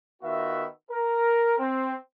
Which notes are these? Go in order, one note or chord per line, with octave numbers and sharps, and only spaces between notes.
D#3 B3 F4 F#4 E5
A#4
C4